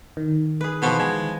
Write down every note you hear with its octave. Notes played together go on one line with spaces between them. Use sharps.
D#3
G#4 B4
B2 E3 F3 B3
G#3